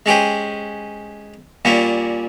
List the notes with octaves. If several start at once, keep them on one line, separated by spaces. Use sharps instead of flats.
G#3 C#4 G4 C5
A#2 G3 A#3 C#4